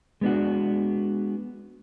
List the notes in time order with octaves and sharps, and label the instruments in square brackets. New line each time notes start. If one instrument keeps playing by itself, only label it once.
[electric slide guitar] G#3 B3 D4 F#4